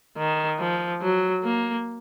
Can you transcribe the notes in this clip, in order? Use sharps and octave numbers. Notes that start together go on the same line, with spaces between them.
D#3
F3
F#3
A#3